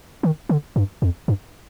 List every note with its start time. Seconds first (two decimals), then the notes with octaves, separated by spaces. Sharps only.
0.23 D#3
0.49 D3
0.76 G2
1.02 F2
1.28 G2